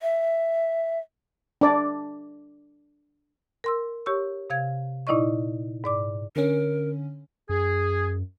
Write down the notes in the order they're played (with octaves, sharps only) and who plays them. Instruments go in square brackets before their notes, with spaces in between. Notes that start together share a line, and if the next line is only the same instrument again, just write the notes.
[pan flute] E5
[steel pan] D4 D5
[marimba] A#4 C6 E6
G4 C#5 C#6 E6
C3 F5 G#6
A#2 D#4 E4 D5 D#5 C#6
G#2 D5 D6
[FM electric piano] D3 C#4 [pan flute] A#4
[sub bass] F#2 [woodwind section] G#4